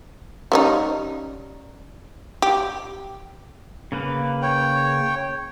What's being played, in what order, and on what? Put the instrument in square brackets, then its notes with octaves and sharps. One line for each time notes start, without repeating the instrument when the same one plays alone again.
[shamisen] G3 C#4 D#4
G4
[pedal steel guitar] C#3 A#3 B4
[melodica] C#5 G5